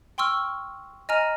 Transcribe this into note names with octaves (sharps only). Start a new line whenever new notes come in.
G5 C6 C#6 E6 F6
D#5 G#5 A#5 F6 D#7